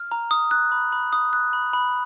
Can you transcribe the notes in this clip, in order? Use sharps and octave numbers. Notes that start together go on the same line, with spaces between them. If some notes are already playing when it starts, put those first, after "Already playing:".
Already playing: F6
A#5
D#6
F#6
B5
B5
D#6
F#6
B5
B5